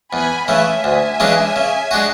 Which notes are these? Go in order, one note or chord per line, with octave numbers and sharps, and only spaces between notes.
E2 G#5 B5
C#3 E3 A3 E5 G#5
D2 E5 G#5
C#3 E3 G#3 D4
C#3
G#3 D4 F#4